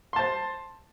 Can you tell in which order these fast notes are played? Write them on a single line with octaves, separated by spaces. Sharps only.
C6 A5 C5